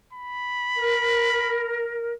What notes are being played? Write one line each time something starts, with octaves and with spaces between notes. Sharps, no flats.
B5
A#4